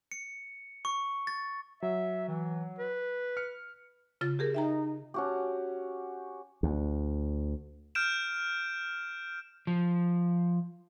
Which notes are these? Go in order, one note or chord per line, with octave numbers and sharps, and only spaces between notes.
C#7
C#6
A6
F#3 E5
E3
B4
F6 C#7
C#3 F4 A6
G4 G#4 A#4
D#4 E5 G5 A#5
C#4 F#4 G4
D2
F6 G6 D7 E7
F3